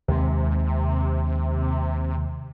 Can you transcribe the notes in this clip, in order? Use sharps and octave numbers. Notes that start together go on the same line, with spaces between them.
D#2 C3 G#3